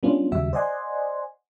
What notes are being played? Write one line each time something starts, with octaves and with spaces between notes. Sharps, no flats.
G3 B3 C#4 D4 F4
D#2 C#3 G3 F#4 E5 E6
C5 D5 D#5 F#5 G#5 C6